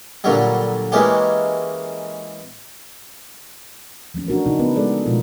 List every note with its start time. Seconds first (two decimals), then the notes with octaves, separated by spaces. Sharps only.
0.24 A#2 D3 F#3 G3
0.92 E3 G#3 A#3 C#4 G4
4.14 E3 F3 A3 C#4
4.28 D4 F#4 A#4
4.46 C#3 D#4
4.59 B3 A#4 B4
4.76 G#3 G#4 A4 D5
5.05 B2 F3 G#3 A3 F4 A#4